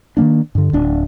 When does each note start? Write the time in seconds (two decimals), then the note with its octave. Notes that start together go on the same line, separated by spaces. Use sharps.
0.17 D#3 F#3 A#3 D4
0.55 G2 D3
0.73 D1 D4